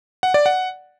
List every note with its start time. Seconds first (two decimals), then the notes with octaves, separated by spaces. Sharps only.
0.23 F#5
0.34 D5
0.46 F#5